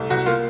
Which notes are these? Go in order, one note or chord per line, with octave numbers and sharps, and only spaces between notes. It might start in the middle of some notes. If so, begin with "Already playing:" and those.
Already playing: C2 A3
C2 F#4
A#3 F4